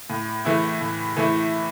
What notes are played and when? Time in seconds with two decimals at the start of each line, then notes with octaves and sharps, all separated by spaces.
0.10 A2
0.45 E3 A3 E4
0.81 A2
1.17 E3 A3 E4